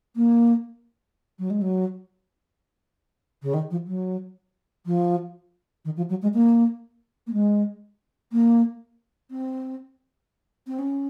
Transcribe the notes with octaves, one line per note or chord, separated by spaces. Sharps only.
A#3
F#3
G#3
F#3
C#3
D#3
F3
F#3
F3
D#3
F3
F#3
G#3
A#3
A#3
G#3
A#3
C4
C4
C#4